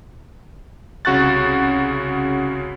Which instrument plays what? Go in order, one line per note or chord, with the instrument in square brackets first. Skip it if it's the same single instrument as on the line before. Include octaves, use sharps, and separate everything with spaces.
[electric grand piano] C2 C#3 F#4 C#6 F#6 A6